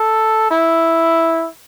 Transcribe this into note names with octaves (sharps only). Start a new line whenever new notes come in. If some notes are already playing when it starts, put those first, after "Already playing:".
Already playing: A4
E4